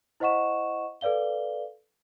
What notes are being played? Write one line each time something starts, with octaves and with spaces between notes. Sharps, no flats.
E4 C5 D#5 F#5 C#6 E7
A4 B4 D5 F5 G7